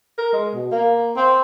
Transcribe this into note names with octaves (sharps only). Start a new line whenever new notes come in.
A#4
G#3
B2
A#3
C4